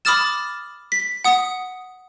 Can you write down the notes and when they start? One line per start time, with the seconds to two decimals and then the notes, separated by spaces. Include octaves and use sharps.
0.05 B5 D6 D#6 F6 A6 E7
0.92 B6
1.24 F#5 D#6